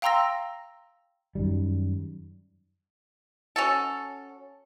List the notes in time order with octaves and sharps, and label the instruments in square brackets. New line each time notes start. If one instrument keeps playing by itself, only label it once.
[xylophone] F5 G5 A#5 C6 E6 A#6
[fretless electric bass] F#2 D#3 G3
[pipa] C#4 F#4 A4